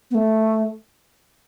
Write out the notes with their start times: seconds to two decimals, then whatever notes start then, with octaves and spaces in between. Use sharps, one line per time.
0.11 B3
0.15 A3